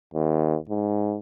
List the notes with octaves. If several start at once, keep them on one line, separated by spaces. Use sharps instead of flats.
D#2
G#2